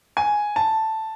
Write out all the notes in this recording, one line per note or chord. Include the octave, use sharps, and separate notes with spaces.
G#5
A5